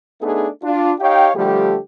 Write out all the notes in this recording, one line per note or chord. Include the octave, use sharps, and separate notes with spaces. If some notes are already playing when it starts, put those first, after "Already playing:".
A3 B3 D4 D#4 G#4 A4
D4 F4
D#4 G4 C#5 F5 G5
D3 F3 G3 A3 G4